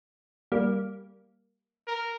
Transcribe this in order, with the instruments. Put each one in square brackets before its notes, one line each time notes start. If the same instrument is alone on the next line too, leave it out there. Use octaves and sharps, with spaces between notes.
[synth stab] G3 A#3
[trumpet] A#4